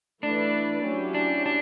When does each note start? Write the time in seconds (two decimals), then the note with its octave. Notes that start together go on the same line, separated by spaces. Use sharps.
0.22 E3 A3 D4 E4 B4 D5
0.84 F#3 C#4 E4 G4
1.14 D4
1.46 D4